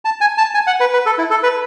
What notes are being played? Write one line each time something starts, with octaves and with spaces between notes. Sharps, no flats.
A5
G#5
A5
G#5
F#5
B4
B4
A4
E4
A4
B4